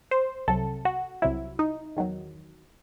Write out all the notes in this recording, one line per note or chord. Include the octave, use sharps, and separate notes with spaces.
C5
C2 C3 F#3 A4
F#4
C2 C3 F#3 E4
D#4
E2 D#3 F#3